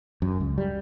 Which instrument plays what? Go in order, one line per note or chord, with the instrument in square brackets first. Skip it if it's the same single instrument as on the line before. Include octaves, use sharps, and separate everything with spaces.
[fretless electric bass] F#2
C#2
G3